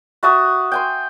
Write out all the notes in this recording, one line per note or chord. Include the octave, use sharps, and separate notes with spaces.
F#4 E5 A5 D#6
G5 G#5 C6